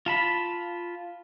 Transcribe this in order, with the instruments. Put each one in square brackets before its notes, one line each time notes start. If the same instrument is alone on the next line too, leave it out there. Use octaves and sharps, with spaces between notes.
[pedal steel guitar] F4 A5 B5